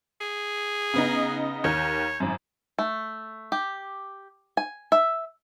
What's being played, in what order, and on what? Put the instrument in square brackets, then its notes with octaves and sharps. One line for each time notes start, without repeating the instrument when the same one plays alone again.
[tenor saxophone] G#4
[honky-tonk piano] C#3 B3 D#4
[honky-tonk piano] D#2 A#4 G6 [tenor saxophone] C#5
[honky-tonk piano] G#1 F#2
[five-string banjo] A3
G4
G#5
E5